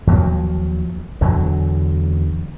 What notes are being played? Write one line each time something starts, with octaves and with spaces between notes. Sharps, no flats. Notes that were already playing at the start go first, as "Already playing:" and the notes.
D#2 F3 F#3
E2 D3 F#3